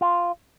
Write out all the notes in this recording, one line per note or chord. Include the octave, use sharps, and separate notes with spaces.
F4